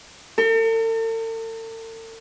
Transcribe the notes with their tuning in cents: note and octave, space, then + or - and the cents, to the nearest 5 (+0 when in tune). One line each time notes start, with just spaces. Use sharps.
A4 +45